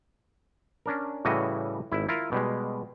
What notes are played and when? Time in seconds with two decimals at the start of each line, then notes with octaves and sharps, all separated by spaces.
0.86 C#4 D4 A#4
1.25 A2 C#3 E3 G3 F#4 D#5
1.92 G#1 E4
2.09 E4 F4 A#4
2.32 B2 G3 G#3